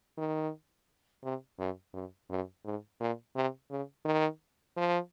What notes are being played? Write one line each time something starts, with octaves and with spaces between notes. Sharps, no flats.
D#3
C3
F#2
F#2
F#2
G#2
A#2
C3
C#3
D#3
F3